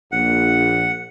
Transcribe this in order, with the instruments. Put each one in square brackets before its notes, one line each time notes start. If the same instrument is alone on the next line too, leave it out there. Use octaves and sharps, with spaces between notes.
[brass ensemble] A#1 [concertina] F#5